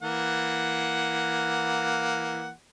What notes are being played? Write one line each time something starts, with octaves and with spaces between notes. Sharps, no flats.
E3 A#3 F#5